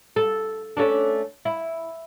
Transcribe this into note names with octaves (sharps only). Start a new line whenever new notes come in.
A4
A3 C#4 D4
E4